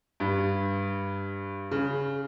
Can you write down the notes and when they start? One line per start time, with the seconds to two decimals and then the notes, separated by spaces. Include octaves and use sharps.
0.20 G2
1.71 C#3